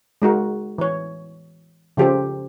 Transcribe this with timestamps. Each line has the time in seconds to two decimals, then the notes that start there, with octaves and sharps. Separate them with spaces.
0.22 G#3 D#4 F#4 A#4
0.78 E3 C#5
1.97 C#3 F3 G4 A4 C5